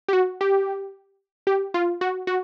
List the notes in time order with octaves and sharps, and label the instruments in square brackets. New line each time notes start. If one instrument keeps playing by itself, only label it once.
[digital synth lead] G4
F#4
G4
G4
F4
F#4
F#4